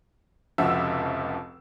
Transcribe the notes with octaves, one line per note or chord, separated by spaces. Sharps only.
F1 C#2 F3 F#4 E5 E6